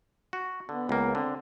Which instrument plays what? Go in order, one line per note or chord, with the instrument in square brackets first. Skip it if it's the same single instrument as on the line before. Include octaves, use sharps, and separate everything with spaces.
[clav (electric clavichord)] F#4
[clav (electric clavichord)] D3 [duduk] B3
[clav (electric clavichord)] C#2 A#3
[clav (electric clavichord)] D3 [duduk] C4